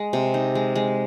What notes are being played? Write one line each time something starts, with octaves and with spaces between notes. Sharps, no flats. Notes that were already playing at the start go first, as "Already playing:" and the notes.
Already playing: G#3
C3
D#4
G#3
G#3